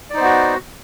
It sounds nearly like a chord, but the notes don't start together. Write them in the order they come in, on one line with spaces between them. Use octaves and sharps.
D5 D#4 C5 B3 F#4